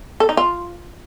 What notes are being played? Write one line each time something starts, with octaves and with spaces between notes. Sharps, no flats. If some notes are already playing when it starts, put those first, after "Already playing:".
A4
D#4
F4